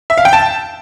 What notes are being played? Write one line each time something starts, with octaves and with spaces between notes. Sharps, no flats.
E5
F5
G5
A5